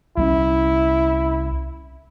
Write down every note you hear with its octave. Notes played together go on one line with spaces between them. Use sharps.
C2 G#3 C#4 E4